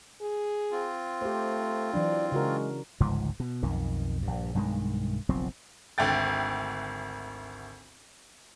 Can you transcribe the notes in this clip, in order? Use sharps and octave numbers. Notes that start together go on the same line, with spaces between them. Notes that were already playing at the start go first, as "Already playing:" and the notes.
G#4
C4 F4
A3 G4 C5
E3 F#3 D4 D5
C#3 G#3 F#4 A#4
G1 C#2 G#2 F3
B2
B1 F2 D#3
A#1 G2
B1 G2 D#3 G#3
F#1 B1 F3 C4
G#1 D2 G5 A6